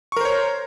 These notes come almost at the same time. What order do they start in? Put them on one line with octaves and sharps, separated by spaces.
C#6 A#4 C5 C#5